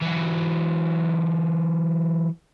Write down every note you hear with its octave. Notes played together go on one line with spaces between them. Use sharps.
E3 F#3